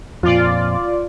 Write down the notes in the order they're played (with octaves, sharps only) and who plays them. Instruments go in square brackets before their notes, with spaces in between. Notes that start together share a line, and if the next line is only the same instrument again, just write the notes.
[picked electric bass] F2 A#2 [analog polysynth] F4 D5